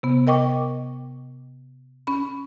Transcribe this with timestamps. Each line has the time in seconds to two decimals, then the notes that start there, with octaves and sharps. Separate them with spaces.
0.03 C3 B3
0.27 A#4 D#5 G5 C#6 D6
2.07 C#4 B5